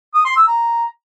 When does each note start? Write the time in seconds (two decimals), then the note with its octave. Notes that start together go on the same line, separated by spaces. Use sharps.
0.14 D#6
0.25 C6
0.37 E6
0.48 A#5